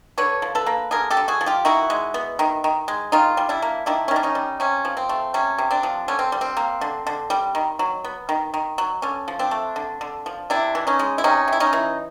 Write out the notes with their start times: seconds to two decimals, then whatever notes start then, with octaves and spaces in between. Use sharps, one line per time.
0.18 D3 B4 C#5
0.42 F3
0.55 A4 B4
0.66 A#3
0.91 D3 G#4 A#4
1.11 G4 A4
1.17 D3
1.28 F#4 G#4
1.41 F3
1.46 F4 G4
1.65 D#3 E4 F#4
1.90 G#3
2.14 B3
2.39 D#3
2.64 D#3
2.88 G#3
3.12 D#3 D#4 F4
3.37 G3
3.49 D4 E4
3.62 A#3
3.86 D#3 D4 E4
4.08 C#4
4.11 D#3
4.16 D4
4.23 C#4 D#4
4.35 G3
4.60 C3 C#4
4.85 F3
4.97 C4
5.09 A3
5.34 C3 C#4
5.58 C3
5.71 C4 D4
5.83 F3
6.08 D3 C#4
6.19 C4
6.32 G3
6.41 C4
6.57 A#3
6.81 D3
7.07 D3
7.30 G3
7.55 D#3
7.79 F#3
8.04 B3
8.29 D#3
8.54 D#3
8.78 F#3
9.02 D3 C#4
9.28 F3
9.39 C4 D4
9.51 A3
9.76 D3
10.01 D3
10.26 F3
10.50 C3 D4 E4
10.75 E3
10.87 C#4 D#4
10.99 G#3
11.18 E4
11.24 C3 C#4 D#4
11.48 C3 E4
11.60 C#4 D#4
11.73 E3